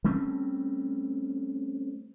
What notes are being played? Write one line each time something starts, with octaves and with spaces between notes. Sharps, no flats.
G3 A3 C4 C#4